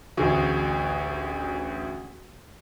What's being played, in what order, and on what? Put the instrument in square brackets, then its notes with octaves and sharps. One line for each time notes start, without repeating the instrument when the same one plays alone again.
[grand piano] A1 D2 [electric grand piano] F#4 G#4